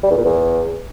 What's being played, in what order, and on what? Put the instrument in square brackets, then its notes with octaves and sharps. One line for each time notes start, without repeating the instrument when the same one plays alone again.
[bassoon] G3
E2
A#2
E2